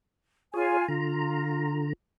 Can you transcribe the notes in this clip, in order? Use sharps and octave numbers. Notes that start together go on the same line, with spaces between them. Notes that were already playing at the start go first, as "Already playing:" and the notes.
F4 G#4 C#5 G#5
D3 F4 A#5